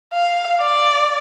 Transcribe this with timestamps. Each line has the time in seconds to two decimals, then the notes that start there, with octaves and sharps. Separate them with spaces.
0.13 F5
0.60 D5